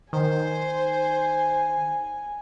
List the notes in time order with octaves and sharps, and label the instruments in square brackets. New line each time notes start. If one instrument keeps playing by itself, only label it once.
[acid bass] D#3 [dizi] C5 [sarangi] G#5